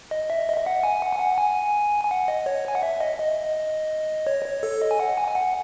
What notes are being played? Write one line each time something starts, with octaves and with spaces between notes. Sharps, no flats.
D#5
E5
D#5
E5
F#5
G#5
F#5
G#5
F#5
G#5
G#5
F#5
D#5
C#5
G#5
F#5
E5
D#5
D#5
C#5
C#5
A4
D#5
G#5
F#5
G#5
G#5
F#5